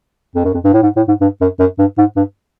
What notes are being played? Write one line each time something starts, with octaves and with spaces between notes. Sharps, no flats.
F2
F#2
F2
G2
A2
G#2
A2
G#2
G2
F#2
F#2
G2
G#2
G2